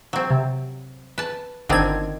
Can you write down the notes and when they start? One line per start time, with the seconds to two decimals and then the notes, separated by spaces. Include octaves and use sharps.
0.13 F#3 C4
0.30 C3
1.18 B4 A5
1.69 G1 D3 D#3 C4 G#6